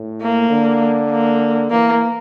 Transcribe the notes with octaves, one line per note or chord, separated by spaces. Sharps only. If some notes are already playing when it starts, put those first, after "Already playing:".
Already playing: A2
A#3
D3
A#3
E3 A#3